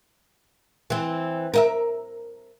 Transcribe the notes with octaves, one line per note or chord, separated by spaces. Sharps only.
E3 C4
A#4 D#5 E5